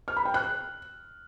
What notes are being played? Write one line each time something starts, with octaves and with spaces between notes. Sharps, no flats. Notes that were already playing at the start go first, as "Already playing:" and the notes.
F6
B5
G5
F#6